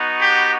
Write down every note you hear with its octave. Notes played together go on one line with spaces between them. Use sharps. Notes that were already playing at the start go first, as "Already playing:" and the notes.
Already playing: B3 D#4 F#4
G4